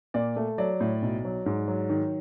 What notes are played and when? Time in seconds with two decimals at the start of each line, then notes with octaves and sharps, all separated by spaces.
0.14 A#2 D5
0.36 A3
0.58 F#3 D5
0.80 A2
1.02 B1
1.25 F#3
1.46 G#2
1.68 F#3
1.90 D#3